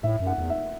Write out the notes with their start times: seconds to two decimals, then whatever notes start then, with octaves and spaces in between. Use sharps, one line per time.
0.03 A2 E5
0.20 F#2
0.27 F#5
0.38 E2
0.50 E5